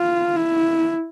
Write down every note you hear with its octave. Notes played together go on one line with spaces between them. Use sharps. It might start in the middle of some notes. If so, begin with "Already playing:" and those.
Already playing: F4
E4